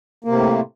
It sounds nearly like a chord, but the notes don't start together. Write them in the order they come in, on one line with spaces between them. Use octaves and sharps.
A#3 C3 A2